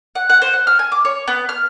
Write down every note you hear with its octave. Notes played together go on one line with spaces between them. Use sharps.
F#5
F#5
C5
F#5
F6
G#5
D6
C#5
B3
F6